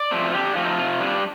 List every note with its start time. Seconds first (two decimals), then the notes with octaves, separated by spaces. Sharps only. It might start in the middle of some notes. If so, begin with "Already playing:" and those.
Already playing: D5
0.11 F3 A3 C4
0.33 D3 G4
0.55 F3 A3 C4 F4
0.65 D#4
0.75 C3 F4
1.00 G3 D4